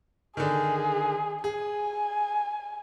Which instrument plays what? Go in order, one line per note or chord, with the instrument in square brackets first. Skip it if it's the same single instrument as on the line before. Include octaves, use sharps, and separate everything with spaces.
[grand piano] D3 D#3 [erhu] G#4
[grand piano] G#4 [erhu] G#5